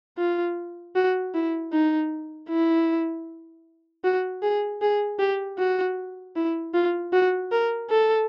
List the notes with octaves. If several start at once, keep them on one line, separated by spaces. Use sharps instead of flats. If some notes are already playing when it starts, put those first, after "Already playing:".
F4
F#4
E4
D#4
E4
F#4
G#4
G#4
G4
F#4
E4
F4
F#4
A#4
A4